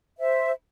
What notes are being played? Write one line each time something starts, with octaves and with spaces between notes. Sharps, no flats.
C5 E5